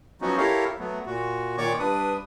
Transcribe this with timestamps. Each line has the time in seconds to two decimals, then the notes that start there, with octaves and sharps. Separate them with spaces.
0.21 F3 F#3 B3 C#4 D#4 F#4
0.38 E4 G4 A4 A#4 C#5 F5
0.79 F#3 A3 B3
1.06 A#2 F#4
1.58 A#2 D#3 C#5 D5 C#6 D6
1.79 G2 D4 B4 D#6